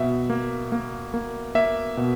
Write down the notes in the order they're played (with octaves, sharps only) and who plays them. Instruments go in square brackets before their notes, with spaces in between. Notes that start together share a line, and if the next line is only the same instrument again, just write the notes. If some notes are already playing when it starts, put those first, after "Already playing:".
Already playing: [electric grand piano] B2 E5
A#3
A#3
A#3
A#3 E5
B2